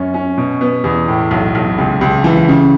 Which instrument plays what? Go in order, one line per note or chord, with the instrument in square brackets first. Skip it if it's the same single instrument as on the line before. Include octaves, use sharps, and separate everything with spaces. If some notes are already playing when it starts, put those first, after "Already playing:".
Already playing: [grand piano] F#2 C#4
C#4
B2
B3
E2
A2
B1
B1
C#2
C#2
E3
C#3